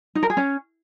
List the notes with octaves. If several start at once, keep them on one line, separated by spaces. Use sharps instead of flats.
D#4
A#4
G#4
C#4